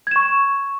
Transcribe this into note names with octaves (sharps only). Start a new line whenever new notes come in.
C#6 G#6 E7